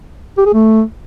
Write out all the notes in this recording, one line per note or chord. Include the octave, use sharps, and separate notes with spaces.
G4
G#4
A3